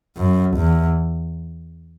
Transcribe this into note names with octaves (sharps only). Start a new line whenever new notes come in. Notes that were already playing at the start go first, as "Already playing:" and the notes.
F#2
E2